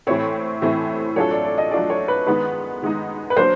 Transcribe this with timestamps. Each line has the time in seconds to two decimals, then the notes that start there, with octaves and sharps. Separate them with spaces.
0.07 A2 E3 A3 C4 E4 C#5
0.62 A2 E3 A3 C4 E4
1.16 F#3 A3 D4 F4 A4 C#5
1.31 D5
1.45 D5
1.58 D#5
1.71 F#3 A3 D4 F4 A4 D5
1.90 C#5
2.08 B4
2.27 D#3 G#3 B3 D#4 B4
2.82 D#3 G#3 B3 D#4
3.30 B4
3.37 F#3 A#3 D4 C5